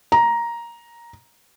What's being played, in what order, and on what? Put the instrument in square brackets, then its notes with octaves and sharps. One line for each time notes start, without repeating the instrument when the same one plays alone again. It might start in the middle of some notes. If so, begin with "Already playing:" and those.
[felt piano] A#5